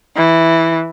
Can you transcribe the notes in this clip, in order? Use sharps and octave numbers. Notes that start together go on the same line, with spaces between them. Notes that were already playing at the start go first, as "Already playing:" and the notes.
E3